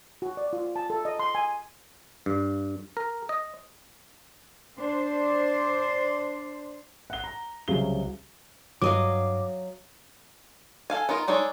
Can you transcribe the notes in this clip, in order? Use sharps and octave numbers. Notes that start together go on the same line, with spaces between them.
F#4
D5
F4
A5
A4
D#5
C6
G#5
G2
A#4
D#5
D4 C5
F#5 G7
A#5
C2 C#3 F#3 G7
G2 F#3 D#5 F5 D6
A4 F5 G#5
B3 D#4 F4 A#4
G#3 D4 D#4 A4 C#5